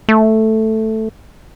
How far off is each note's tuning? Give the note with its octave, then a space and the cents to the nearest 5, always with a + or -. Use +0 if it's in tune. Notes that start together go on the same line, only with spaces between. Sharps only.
A3 +0